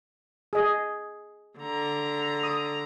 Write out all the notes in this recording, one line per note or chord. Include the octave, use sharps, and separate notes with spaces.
G#4 D#5
D3 A#5
D#6